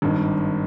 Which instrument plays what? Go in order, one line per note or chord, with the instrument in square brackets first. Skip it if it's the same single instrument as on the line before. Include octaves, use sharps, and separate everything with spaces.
[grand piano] G#1 G2 D#3